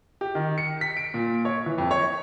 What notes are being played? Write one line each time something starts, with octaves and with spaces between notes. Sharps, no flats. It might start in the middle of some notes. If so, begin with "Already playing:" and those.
G4
D#3
C#7
B6
D7
A#2
C#5
E3
F2
C#5